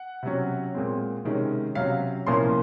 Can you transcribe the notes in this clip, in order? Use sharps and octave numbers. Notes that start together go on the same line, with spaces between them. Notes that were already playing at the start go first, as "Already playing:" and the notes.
Already playing: F#5
C3 F#3 C#4
A#2 G#3 C4
C3 D#3 G#3 C#4
C3 F#3 C#4 F5
C2 A#2 F3 A#3 C#4 C6